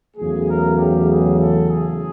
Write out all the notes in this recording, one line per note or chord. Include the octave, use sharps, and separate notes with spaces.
E2 C#3 F#3 A3 G#4
A#4
G4
G#4
A4
G#4